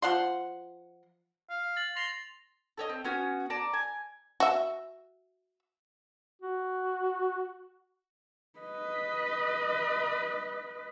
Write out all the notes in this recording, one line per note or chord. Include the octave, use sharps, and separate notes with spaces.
F3 F#5 C6
F5
A6 F#7
C6 A#6 F7
A4 C#5 D#5
C4
B3 C#4 F#4
D5 A5 A#5
G#5
F#4 E5
F#4
B4 D#5